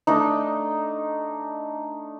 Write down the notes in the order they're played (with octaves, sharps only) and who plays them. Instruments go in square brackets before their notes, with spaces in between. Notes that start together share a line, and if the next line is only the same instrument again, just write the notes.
[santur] A3 D4 D#4